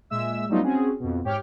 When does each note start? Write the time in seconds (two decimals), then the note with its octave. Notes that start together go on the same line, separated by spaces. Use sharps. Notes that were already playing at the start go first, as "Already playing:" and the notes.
0.10 A#2 G#3 E5 E6
0.49 F#3 G3 A3 B3 D#4 F4
0.63 C4 C#4 F#4 G#4
0.99 F2 B2
1.24 G#2 G4 C#5 G5 F6